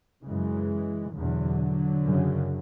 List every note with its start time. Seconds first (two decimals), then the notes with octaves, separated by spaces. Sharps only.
0.24 F#2 C#3 E3 G#3
1.13 E2 B2 D3 F#3
2.04 F#2 C#3